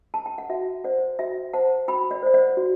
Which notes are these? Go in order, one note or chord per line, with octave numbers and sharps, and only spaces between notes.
A5
G5
F#5
F#4 E5
C5 D5 F#5
F#4 E5 G5
C5 F#5 A5
F#4 G5 B5
D5
C5 D5
D5 F#5
F#4